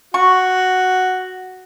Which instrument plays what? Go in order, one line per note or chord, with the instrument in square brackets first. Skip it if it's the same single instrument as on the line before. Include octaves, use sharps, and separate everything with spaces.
[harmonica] F#4 [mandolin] C#6